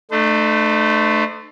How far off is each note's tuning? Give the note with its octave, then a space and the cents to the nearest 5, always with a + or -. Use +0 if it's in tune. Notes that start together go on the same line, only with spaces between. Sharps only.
A3 +0 D#4 -45 C5 -35